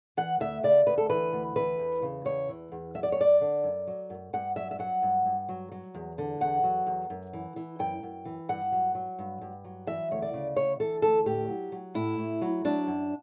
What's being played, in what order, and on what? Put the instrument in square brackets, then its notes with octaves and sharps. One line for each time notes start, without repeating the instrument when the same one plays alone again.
[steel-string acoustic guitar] E3 F#5
D2 E5
C#3 D5
D2 B4
A4
E3 B4
D2
E3 B4
E2
C#3
E2 C#5
E3
E2
F#3 E5
D5
C#5
F#2 D5
D3
F#2
F#3
F#2
G2 F#5
F#3 E5
E5
F#3 F#5
G2
G2
F#3
F#3
E2
D3
E2 F#5
F#3
E2
F#2
E3
E3
F#2 G5
F#2
E3
G2 F#5
F#3
F#3
G2
G2
F#3
E3 E5
D2 C#5
D5
C#3
D2 C#5
E3 A4
D2 A4
A2 G4
F#3
F#3
A2 E4
A2
F#3
F#3 D4
F#2